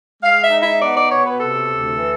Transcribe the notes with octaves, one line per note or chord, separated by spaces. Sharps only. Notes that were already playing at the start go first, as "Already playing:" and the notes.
G#3 F5
E5
D#4
E5
B3 D5
D5
B2 C#5
B4
C3 A4
D2
E3